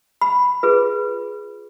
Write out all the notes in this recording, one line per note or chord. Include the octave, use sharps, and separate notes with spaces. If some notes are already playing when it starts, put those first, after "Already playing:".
B5
F4 G#4 B4